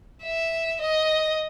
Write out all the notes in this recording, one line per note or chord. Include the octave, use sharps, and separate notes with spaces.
E5
D#5